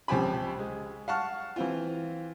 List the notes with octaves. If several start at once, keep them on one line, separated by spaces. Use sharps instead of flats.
C#2 F3 C4 G4 G#5 B5
G#3
F5 F#5 A5 C#6 F6
E3 C4 F4